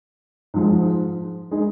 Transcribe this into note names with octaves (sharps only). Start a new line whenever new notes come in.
G#2 F3 G#3
G#3 D#4 G#4